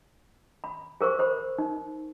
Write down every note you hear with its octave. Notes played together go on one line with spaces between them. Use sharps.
B5
G#4 A#4 C5 C#6
A4 C5 B5
D#4